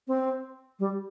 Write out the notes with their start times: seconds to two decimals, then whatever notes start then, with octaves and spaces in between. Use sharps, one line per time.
0.07 C4
0.79 G3